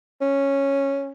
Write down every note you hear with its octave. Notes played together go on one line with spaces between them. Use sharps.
C#4